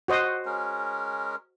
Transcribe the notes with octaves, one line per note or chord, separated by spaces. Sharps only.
F#4 C5 D#5
G#3 C#4 A#4